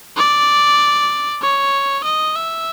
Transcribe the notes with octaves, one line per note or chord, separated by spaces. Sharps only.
D5
C#5
D#5
E5